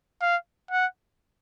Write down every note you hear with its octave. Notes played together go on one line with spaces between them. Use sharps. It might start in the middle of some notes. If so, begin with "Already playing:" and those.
F5
F#5